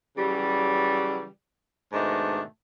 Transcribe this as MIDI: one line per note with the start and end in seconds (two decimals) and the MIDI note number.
0.17 1.26 49
0.17 1.26 52
0.17 1.26 54
0.17 1.26 55
1.92 2.41 44
1.92 2.41 47
1.92 2.41 51
1.92 2.41 57
1.92 2.41 62